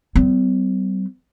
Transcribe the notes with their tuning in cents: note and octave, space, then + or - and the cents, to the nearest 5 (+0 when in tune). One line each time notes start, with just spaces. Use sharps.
G3 -40 C4 -45